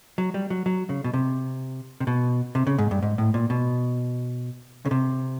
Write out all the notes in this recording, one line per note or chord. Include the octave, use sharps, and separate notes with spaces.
F#3
G3
F#3
F#3
C#3
B2
C3
C3
B2
C3
C#3
G#2
G2
G#2
A2
A#2
B2
C#3
C3